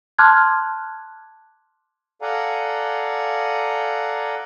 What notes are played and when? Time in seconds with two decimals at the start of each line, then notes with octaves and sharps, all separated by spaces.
0.19 A5 C6 D6 F6 F#6 G#6
2.22 A4 D5 F5 F#5 G#5 A#5